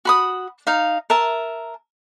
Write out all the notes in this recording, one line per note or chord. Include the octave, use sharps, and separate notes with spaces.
F#4 B5 D#6
D#4 F5
A#4 E5 A5